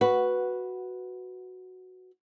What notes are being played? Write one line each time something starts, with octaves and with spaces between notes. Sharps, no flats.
F#4 B4